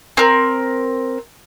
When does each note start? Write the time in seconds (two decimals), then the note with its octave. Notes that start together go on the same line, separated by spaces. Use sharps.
0.17 C4 A#4